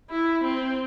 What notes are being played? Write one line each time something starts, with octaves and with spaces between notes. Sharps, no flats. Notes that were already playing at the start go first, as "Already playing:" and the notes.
E4
C4